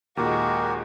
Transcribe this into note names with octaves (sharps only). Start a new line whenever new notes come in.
D#2 A#2 G#3 F#4 G4 A#4